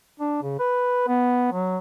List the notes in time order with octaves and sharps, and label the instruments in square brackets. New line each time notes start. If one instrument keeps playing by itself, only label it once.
[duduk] D4
C#3
B4
B3
F#3